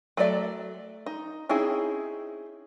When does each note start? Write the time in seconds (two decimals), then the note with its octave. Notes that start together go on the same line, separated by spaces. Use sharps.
0.17 F#3 A3 A4 D5 E5
1.06 D#4
1.49 C4 C#4 D#4 E4 G#4